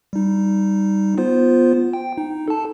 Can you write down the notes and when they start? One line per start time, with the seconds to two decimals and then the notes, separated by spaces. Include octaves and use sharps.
0.13 G3 D#4
1.18 B3 F4 C5
1.93 G5
2.18 D#4
2.48 A4 A5